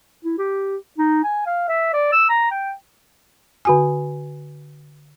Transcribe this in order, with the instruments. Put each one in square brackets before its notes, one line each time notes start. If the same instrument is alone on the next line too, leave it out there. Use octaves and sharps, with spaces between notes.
[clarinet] E4
G4
D#4
G#5
F5
E5
D5
E6
A#5
G5
[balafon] D3 F#4 G#5